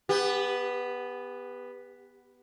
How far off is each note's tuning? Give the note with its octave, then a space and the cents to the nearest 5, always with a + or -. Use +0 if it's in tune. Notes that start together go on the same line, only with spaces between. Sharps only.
B3 +0 G4 +35